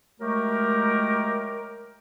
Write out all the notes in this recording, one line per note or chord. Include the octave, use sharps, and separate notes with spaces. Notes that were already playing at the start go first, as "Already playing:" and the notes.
F#3 G#3 A3 G4 A#4